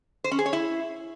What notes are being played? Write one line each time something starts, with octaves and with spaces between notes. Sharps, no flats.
C5
C#4
G#4
C#5
E4